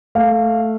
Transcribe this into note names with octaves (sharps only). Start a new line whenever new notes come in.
A3 F5